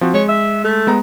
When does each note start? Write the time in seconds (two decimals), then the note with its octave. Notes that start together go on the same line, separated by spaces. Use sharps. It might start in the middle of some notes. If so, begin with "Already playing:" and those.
0.01 F3 C4 F#4
0.14 G#3 C#5
0.28 E5
0.64 A3
0.87 G#3 B3 A#5